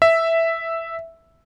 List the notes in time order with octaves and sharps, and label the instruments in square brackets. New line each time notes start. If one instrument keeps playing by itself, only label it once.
[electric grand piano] E5